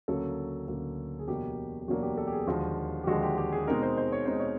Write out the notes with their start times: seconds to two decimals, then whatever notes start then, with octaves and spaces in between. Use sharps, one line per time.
0.08 D2 C#3 F#3 A#3 A4
0.68 D2 C#3 F#3 A#3
1.19 G#4
1.28 E2 B2 F#3 A#3 D4 G4
1.80 G4
1.88 E2 B2 F#3 A#3 D4 F#4
2.03 G4
2.17 A4
2.27 G4
2.33 G#4
2.47 D#2 D3 F3 G#3 F#4
3.03 G4
3.07 D#2 D3 F3 G#3 F#4
3.23 G4
3.38 G4
3.53 G#4
3.67 B2 G#3 C4 D#4 A#4
3.83 C5
3.97 C5
4.12 C#5
4.25 B2 G#3 C4 D#4 C5
4.40 C#5